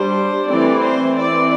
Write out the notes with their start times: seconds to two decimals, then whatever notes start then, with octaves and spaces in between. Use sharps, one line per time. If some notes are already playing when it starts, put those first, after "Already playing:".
Already playing: G3 D4 C5
0.48 E3 A3 C4 D5
0.83 C5
1.16 E3 C4 D5